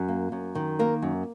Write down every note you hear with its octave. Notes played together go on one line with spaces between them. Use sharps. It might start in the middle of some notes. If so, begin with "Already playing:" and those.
Already playing: F#2
A#3
F#2
D#3
A#3 A#4
F#2